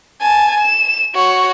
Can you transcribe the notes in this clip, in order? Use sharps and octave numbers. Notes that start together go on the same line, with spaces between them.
G#5 A5
E7
F#4 C#5